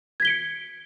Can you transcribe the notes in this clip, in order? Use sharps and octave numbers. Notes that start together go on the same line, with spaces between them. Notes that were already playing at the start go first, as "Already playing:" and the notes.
G#6 B6 C#7 D7 G7